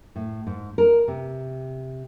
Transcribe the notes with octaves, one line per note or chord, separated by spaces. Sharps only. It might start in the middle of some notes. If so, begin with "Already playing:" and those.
A2
G#2
A#4
C3